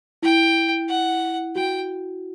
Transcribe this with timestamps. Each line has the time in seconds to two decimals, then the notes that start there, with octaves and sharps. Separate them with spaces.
0.23 E4 G5
0.89 F#5
1.56 F#4 G5